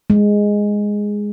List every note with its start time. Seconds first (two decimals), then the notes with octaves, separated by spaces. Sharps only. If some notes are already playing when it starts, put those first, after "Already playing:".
0.10 G#3